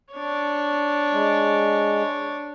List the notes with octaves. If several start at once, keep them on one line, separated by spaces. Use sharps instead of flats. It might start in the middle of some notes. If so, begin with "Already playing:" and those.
D4 C#5
G#3